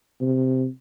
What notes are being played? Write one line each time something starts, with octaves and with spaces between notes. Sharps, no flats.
C3